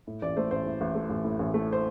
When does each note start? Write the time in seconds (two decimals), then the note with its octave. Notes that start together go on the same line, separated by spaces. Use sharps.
0.07 A2
0.22 A1 D5
0.37 A3 C5
0.51 A1 C5
0.66 A2
0.81 A1
0.95 A3
1.10 A1
1.24 A2
1.39 A1
1.54 A3
1.73 C5